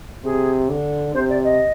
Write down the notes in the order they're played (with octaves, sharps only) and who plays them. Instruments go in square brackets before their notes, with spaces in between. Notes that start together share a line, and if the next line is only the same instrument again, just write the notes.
[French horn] C3 [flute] G#4
[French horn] D3
[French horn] C3 [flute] C5
[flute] D5
D#5